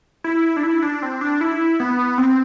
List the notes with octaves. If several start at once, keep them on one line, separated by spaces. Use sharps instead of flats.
E4
D4
E4
D4
C4
D4
E4
B3
C4